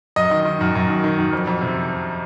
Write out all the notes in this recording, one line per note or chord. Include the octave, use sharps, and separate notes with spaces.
F#2 D#5
D#3
D#3
F#2
F#2
D#3
D#3
F#2
F2
F2
C3